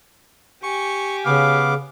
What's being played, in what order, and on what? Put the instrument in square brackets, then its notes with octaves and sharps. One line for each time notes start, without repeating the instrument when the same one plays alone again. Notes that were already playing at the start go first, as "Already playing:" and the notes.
[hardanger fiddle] G4 G#5 [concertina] C#6
[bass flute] C#3 [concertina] B3 D6 [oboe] F5